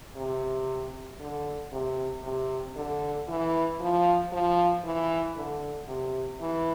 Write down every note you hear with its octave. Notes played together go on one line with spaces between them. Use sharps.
C3
D3
C3
C3
D3
E3
F3
F3
E3
D3
C3
E3